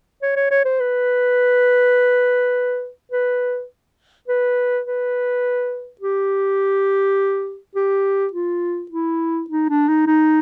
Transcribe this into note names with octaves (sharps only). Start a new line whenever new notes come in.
C#5
C#5
C#5
C5
B4
B4
B4
B4
G4
G4
F4
E4
D#4
D4
D#4
D#4